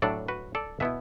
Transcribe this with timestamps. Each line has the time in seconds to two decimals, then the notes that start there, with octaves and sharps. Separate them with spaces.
0.02 A2 F#3 D4 A4 D5
0.28 F#4 B4
0.55 A4 D5
0.80 B2 B3 E4 B4 E5